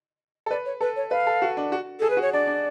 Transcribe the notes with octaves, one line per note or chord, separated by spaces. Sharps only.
A4
B4 D5
C#5
A4 B4
C#5
B4 F5
A4
F#4
D4
F#4
G#4 A4
B4
F#4
C#5
D4 D5
D4